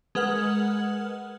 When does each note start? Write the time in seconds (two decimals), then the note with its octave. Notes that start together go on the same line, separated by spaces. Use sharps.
0.15 G#3 A#4 B4 F#5 F6 F#7